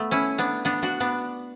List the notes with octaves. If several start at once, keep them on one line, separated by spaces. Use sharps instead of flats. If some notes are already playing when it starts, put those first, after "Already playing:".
Already playing: A3 B3
C#4 E4
B3 D4
B3 D4
D4 F#4
B3 D4